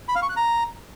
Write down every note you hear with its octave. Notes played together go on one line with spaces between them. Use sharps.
B5
F5
C#6
F#6
A#5